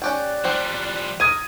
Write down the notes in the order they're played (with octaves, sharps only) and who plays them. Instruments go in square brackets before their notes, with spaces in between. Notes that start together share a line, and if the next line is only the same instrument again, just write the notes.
[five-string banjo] C#4 G4 G5 [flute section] D5 F#6
[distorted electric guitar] F3 G3 [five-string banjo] C4 G4
[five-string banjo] A#4 [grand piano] D#6 G#6 D#7